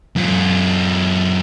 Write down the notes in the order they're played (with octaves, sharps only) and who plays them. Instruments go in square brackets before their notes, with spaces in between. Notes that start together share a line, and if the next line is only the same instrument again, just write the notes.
[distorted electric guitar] F#2 F4